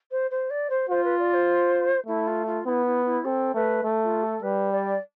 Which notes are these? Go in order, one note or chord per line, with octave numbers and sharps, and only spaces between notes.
C5
C5
D5
C5
F4 C5
B4
D5
C5
A3 E4
F4
F4
B3 E4
E4
E4
C4 A4
A3 B4
A3
F4
A4
G3 B4
D5